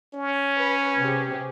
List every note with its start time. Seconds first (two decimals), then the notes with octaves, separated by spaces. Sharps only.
0.14 C#4
0.59 B4
0.99 C3 G4 G#4